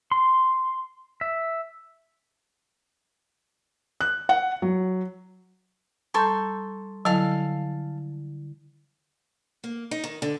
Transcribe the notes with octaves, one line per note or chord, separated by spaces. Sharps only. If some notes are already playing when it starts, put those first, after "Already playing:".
C6
E5
F#6
F#5
F#3
G3 A4 A#5 C6 C#6 G6
D3 F#3 E4 A4 F5 G#5
A#3
D#4
D#3
D3